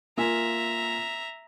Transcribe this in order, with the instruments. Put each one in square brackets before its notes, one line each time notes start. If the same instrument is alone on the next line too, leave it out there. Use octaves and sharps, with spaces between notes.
[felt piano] A#3 F4 G#5 [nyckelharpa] E5 A#5